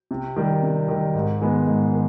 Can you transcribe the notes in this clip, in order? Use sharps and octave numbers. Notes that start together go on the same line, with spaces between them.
C3
D#3 G3
C3
D#3 G3
G#2
D#3 G#3 B3
G#2
D#3